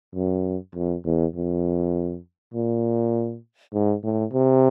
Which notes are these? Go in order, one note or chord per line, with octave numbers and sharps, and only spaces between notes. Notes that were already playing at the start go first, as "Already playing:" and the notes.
F#2
F2
E2
F2
A#2
G#2
A2
C3